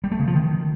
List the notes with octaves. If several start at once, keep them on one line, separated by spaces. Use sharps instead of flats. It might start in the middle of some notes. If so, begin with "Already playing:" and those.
G3
A3
C#3
F3
D#3